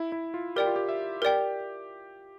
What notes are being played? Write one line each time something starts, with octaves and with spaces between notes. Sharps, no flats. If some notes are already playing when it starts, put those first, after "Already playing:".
Already playing: E4
E4
F4
G4 A#4 D5 G5
F4
G4
E5
G4 A#4 D5 G5